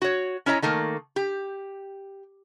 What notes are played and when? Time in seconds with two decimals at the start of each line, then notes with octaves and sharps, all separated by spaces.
0.02 F#4 C#5
0.46 C#4 E4 C#5 D#5 A#5
0.62 D#3 A3 A#3
1.16 G4